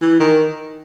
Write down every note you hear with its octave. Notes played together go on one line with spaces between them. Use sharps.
E3
D#3